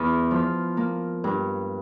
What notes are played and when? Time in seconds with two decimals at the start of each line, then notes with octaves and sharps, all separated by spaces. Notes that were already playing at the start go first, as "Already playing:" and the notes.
Already playing: E2
0.31 F3
0.77 A#3
1.24 G2